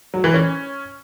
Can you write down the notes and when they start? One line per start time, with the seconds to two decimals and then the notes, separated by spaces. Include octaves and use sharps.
0.14 F#3
0.24 E3
0.34 C#4